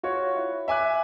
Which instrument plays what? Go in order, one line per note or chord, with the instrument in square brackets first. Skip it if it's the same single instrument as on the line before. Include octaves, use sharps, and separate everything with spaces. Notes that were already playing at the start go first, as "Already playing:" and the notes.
[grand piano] F4 F#4 C#5
E4
E5 G#5 D6 F#6